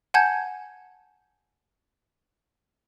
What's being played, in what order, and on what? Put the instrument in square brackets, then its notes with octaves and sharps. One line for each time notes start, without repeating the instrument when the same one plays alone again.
[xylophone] F#5 G#5 A5 G6 G#6